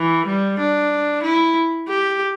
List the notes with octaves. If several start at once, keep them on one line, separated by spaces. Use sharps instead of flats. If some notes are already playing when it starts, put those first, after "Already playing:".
Already playing: E3
G3
D4
E4
G4